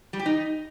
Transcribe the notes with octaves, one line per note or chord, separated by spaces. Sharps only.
G3
G4
D#4